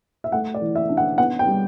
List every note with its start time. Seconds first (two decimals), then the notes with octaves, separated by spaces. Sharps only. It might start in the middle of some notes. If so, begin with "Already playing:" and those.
0.24 E5
0.32 A3 F#5
0.54 D5
0.62 E3
0.75 E5
0.89 D4
0.97 F#5
1.18 B3 F#5
1.39 G5
1.47 G3